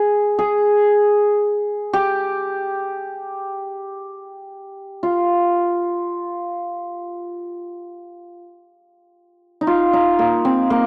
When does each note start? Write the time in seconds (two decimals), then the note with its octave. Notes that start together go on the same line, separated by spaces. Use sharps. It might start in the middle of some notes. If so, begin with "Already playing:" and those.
Already playing: G#4
0.39 G#4
1.93 G4
5.03 F4
9.61 D#4
9.67 F4
9.93 D#4
10.19 A#3
10.45 C4
10.70 A#3